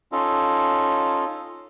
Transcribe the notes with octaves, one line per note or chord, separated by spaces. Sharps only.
C#4 D#4 F4 A4